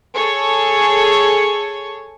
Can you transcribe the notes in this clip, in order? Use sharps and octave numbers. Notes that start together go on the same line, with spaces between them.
G#4 A4 C#5